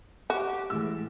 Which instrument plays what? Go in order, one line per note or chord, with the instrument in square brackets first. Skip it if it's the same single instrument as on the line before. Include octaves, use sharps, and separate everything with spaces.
[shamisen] F#4 [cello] G4
[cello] A2 [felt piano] E3 G#3 E6